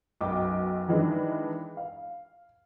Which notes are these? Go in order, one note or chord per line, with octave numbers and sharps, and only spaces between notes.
B1 F#2 G5 D6
D#3 E3 G#3 D4
F5